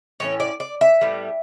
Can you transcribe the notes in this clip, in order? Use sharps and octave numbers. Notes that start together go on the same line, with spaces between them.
A2 E3 C#4 C#5
D5
D5
E5
A2 G3 B3